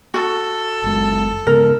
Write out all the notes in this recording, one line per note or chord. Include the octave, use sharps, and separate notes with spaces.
F#4 A4
F#1 G#3
C#3 G#3 B3 A#4